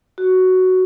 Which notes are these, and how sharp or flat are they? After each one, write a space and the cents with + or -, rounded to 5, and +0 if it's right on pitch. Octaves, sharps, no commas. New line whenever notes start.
F#4 +5